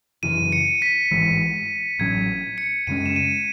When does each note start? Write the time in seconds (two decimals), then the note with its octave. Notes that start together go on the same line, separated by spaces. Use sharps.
0.23 F#2 C#3 E3 D#7
0.52 C#7
0.82 B6
1.11 A1 G#2 E3 G#3
1.99 A1 A2 F#3 C#4 G#6
2.58 C#7
2.87 F#2 C#3 G#3 C#4 D#7
3.06 E7
3.16 D#7